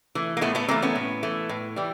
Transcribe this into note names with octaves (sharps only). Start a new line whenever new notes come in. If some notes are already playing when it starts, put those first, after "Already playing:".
E3 A3
A#3
A2 A3 B3
A3 B3
E3 A3 A#3 C4
B3 C#4
A2
E3 A3
A2
E3 G3